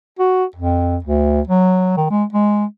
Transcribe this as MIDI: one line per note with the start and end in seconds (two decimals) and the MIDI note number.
0.19 0.44 66
0.56 0.97 41
1.04 1.41 38
1.48 1.94 54
1.97 2.08 51
2.10 2.25 56
2.33 2.66 56